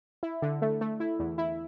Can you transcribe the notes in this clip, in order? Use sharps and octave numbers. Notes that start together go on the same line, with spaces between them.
E4
D3
A3
A3
E4
E2
E4